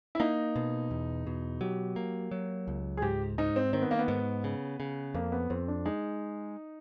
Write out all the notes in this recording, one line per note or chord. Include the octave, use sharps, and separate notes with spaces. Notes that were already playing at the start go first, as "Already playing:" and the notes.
E4
A#3 D#4
B2
E2
B2
F#3 G4
A#3
F#3
C#2
G#4
G#2 G4
G#2 D#4
C4
D#3 C4
B3
A#3
B3
G#2
C#3
C#3
F2 A#3
B3
F2 C4
D4
G#3 D#4